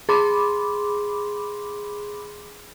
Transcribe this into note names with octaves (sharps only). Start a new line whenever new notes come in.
G#4 B5 C6 D6